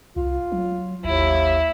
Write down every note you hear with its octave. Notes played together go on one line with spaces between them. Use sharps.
C2 F4
F#3
G#1 D#2 E4